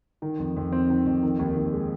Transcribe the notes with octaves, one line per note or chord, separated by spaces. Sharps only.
D#3
F2
F2
C4
D#3
F2
D#3
D#2
D#2
G#3